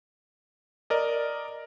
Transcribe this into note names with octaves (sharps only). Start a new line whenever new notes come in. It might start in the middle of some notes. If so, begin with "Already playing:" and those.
A#4 D5 D#5